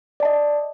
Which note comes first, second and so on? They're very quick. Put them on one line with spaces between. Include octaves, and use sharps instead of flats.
D5 A5 D#5